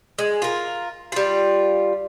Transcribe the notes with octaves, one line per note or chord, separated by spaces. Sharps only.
G#3
F4 A#4
G3 F4